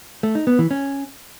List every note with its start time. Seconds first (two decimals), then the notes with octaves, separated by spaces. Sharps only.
0.23 A3
0.35 D#4
0.47 B3
0.59 E3
0.71 C#4